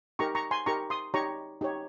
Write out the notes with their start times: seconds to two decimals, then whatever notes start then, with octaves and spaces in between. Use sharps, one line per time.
0.19 D#4 G4 A#4 A#5 C#6
0.35 A#5 C#6
0.51 G#5 C6
0.66 D#4 G4 A#4 A#5 C#6
0.90 C6 D#6
1.14 D#4 G4 C#5 A#5 C#6
1.61 D#4 G4 C#5